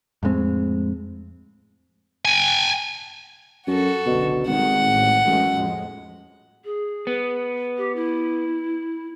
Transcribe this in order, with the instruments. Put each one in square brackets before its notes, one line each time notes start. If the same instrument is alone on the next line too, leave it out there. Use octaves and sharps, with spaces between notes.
[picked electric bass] F2 A2 G#3 C4
[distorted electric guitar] G5 G#5
[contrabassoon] F#2 [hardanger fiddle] F#4 A4
[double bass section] F#1 C#2 D3 [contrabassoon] B2
[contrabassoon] G#1 [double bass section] D#3 G3 [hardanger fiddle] F#5
[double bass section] A1 A2
[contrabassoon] F#2 [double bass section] E3 G#3 A3
[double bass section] F2 A2 G#3
[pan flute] G#4
[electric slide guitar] B3
[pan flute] G4
E4